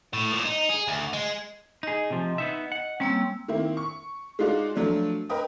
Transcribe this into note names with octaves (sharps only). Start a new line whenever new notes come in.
A2
A#2
D#4
G#4
D2
G#3
D#4 G#4 D#5
C3 F3
B3 D#4 E5
F#5
G3 A#3 C4 C#4 E6
D#3 A#3 C4 E4
C#6
G#3 D#4 F4 F#4 D5
F3 F#3 A3 D4
A#4 B4 D#5 G5 D#6